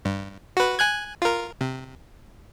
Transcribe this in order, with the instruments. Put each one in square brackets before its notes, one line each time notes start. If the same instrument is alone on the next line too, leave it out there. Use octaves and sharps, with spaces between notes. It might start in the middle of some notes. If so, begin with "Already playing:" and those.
[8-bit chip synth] G2
F#4 B4
G#5 F#6 G#6
F4 A#4
C3